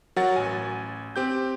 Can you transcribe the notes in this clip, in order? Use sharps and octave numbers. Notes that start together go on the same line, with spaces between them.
F#3 F#4 A#4 F#5 A6
A1 G#5
C4 G4 G6